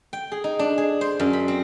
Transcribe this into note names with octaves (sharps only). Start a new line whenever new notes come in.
G5
G#4
D#4
D4
G#4
C5
F#2
B5
C4